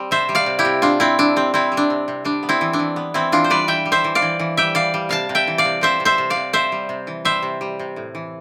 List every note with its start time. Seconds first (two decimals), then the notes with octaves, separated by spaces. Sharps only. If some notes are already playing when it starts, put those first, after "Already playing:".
Already playing: G3 C4
0.11 C3 C5 E5
0.29 G3
0.35 D5 F5
0.46 C3
0.59 E4 G4
0.65 C3
0.82 C4 D4 F4
1.00 C3 C4 E4
1.19 G3 D4
1.36 C3 C4
1.54 G3 C4 E4
1.72 G3
1.77 D4
1.90 C3
2.08 C3
2.25 G3 D4
2.43 B3
2.49 C4 E4
2.61 E3
2.73 D4
2.79 E3
2.96 B3
3.14 E3 C4 E4
3.32 E3 D4 F4
3.44 C5
3.50 G3 B4 D5
3.68 E3 E5 G5
3.86 G3
3.92 C5 E5
4.04 E3
4.15 D5 F5
4.22 E3
4.40 E3
4.57 G3 E5 G5
4.75 E3 D5 F5
4.94 G3
5.09 C3 F5 A5
5.29 C3
5.35 E5 G5
5.47 E3
5.58 D5 F5
5.65 C3
5.81 C3 C5 E5
6.00 C3
6.05 C5 E5
6.18 C3
6.30 D5 F5
6.36 C3
6.53 C3 C5 E5
6.72 G3
6.89 C3
7.07 E3
7.25 G3 C5 E5
7.43 C3
7.61 G3
7.79 C3
7.96 A2
8.15 E3